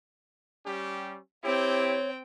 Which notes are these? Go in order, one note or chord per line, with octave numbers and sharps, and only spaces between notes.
G3 C#4 G4
C4 E4 G4 C#5 G5